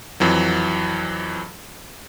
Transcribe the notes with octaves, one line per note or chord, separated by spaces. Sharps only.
F2 E3 F#3